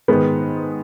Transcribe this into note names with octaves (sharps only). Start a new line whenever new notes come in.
G#2 D#3 G#3 B3